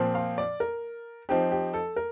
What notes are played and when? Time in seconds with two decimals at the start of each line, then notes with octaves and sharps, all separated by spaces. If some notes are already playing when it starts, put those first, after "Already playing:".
Already playing: A#2 F3 C4
0.15 F5
0.38 D5
0.60 A#4
1.29 F3 C4 D#4 G4
1.51 G4
1.74 A4
1.96 A#4